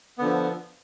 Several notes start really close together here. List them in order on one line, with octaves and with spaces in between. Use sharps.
B3 D3 F3